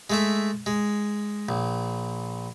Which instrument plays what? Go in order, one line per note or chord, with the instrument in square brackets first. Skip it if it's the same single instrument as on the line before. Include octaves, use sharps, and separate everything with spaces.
[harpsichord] G#3 A3 E5
G#3
A#1